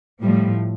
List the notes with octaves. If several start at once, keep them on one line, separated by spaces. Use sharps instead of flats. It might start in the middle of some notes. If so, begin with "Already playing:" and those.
A2 F3 G3